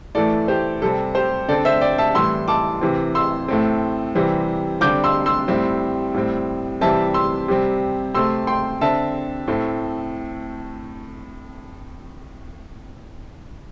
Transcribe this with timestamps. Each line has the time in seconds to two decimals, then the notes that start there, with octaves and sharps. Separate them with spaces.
0.15 A2 E3 A3 A4 D5
0.48 G4 C5
0.82 C3 G3 C4 A4
1.15 G4 C5
1.48 D3 C4 A4 D5
1.65 C5 E5
1.81 D5 G5
1.98 E5 A5
2.15 A2 E3 G3 C6 E6
2.48 A5 D6
2.81 C3 E3 C4
3.15 C6 E6
3.48 A2 A3 C4
4.15 C3 E3 G3 C4
4.81 D3 G3 C4 D6 G6
5.04 C6 E6
5.26 C6 E6
5.48 A2 G3 C4
6.14 A2 G3 C4
6.81 C3 E3 G3 C4 E5 A5
7.14 C6 E6
7.48 C3 G3 C4
8.15 C3 A3 C4 C6 E6
8.47 G5 C6
8.81 D3 C4 E5 A5
9.48 A2 A3 C4